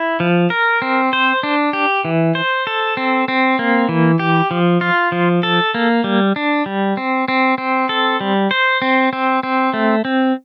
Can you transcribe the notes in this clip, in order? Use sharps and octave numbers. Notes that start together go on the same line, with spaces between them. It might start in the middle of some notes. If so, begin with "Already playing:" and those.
Already playing: E4
F3
A#4
C4
C5
D4
G4
E3
C5
A4
C4
C4
A#3
E3
G4
F3
F4
F3
A4
A#3
G3
D4
G3
C4
C4
C4
A4
G3
C5
C4
C4
C4
A3
C4